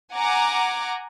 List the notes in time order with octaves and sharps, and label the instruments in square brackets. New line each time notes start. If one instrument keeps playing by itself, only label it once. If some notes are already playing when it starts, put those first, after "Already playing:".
[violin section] F#5 G#5 A#5 D6